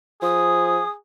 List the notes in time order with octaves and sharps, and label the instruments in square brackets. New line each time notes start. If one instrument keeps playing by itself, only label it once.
[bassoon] F3 [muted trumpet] G#4 [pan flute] D#6